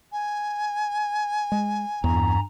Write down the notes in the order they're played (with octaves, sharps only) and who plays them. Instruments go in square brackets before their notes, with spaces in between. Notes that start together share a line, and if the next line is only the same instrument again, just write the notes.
[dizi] G#5
[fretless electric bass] G#3
[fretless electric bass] E2 [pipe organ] G2 A#5